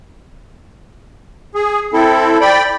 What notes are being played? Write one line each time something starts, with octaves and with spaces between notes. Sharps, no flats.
G#4
C4 E4 A4
D5 G5 B5